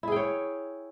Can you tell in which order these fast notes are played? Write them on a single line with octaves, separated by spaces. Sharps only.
E4 G#4 G5 C#5